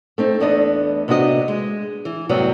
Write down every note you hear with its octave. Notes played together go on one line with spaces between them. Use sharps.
A3 C4 D#4
E2 B3 D4 A4 D#5
C3 B3 D4 F#4 D#5
G#3
E3
F#2 A2 C3 F#3 G3 B3